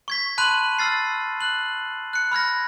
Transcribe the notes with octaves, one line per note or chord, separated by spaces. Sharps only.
C#6 G#6 B6
A5 B5 C6 F#6 D#7 F#7
E6 F6 A6 C7
F#6 F#7
F#6 C#7
B5 F6 G#6 A#6